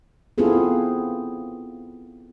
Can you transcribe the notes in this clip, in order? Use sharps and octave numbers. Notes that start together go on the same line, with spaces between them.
B3 C4 E4 F4 G#4 A4